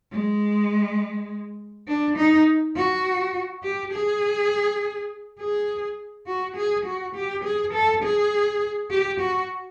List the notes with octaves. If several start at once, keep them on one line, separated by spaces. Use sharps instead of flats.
G#3
D4
D#4
F#4
G4
G#4
G#4
F#4
G#4
F#4
G4
G#4
A4
G#4
G4
F#4